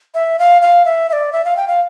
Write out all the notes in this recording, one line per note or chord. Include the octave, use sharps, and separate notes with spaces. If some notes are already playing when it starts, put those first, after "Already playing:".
E5
F5
F5
E5
E5
D5
E5
F5
G5
F5